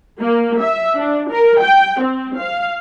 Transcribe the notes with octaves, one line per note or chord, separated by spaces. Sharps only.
A#3
E5
D4
A#4
G5
C4
F5